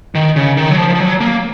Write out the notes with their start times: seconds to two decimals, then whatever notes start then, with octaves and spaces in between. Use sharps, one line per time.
0.15 D#3
0.36 C#3
0.57 D#3
0.70 F#3
0.78 F3
0.95 F3
1.00 F#3
1.21 A#3